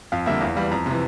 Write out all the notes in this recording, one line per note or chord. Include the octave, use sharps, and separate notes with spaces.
F2 F5
D3 G3 A#3 E5
E2 F5
E3 G3 F5
F2 A#5
C3 E3